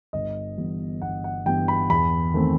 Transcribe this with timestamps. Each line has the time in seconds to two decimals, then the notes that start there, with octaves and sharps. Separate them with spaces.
0.13 G1 D#5
0.58 G2 E3 B3
1.02 G1 F#5
1.24 F#5
1.46 G2 E3 B3 G5
1.68 B5
1.90 E2 B5
2.34 D#3 A3 C4